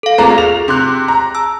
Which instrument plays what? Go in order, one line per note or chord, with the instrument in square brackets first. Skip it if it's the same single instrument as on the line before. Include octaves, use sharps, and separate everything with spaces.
[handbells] A4 F5
[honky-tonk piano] C2 A#3 A#5 [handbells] F4 G#4
[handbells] G#4 [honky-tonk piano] F7
[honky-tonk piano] C3 C6 F#6
A#5
[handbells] A5 E6